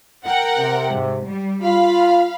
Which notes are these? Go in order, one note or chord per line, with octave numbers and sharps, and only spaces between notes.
A#4 F#5 G5
C3
G#2
G3
F4 F5 B5